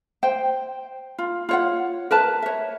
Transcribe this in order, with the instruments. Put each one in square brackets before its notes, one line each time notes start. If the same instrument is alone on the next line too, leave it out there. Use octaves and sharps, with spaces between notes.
[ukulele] C5 G5
F4
F4 C#5 F#5
A#4 B4 A5
C#5 E5